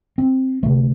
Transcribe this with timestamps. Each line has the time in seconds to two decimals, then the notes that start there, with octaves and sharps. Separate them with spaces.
0.18 C4
0.63 D2 C3 A3